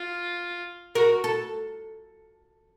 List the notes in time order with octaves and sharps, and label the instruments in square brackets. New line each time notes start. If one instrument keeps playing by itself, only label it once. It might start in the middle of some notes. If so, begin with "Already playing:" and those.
Already playing: [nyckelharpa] F4
[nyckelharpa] F#4 [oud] A#4
[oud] A4